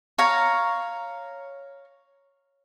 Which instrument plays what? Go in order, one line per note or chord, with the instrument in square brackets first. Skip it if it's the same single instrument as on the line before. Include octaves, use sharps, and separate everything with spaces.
[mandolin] C#5 F5 A#5